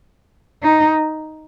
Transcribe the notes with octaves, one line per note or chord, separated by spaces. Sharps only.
D#4